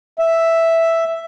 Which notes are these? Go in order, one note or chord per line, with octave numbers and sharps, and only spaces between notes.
E5